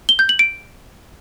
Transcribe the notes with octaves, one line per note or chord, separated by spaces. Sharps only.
G7
G6
F#7
D7